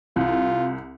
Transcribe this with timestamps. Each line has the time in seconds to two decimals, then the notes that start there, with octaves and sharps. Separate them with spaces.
0.16 C2 F4